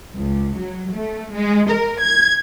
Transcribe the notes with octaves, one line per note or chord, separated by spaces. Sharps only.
C#2
F#3
A3
G#3
A#4
G#6